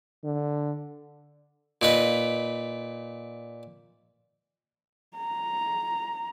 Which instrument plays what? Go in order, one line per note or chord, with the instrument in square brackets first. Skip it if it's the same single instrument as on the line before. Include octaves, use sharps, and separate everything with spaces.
[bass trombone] D3
[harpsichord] A#2 D#4 B4
[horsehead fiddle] A#5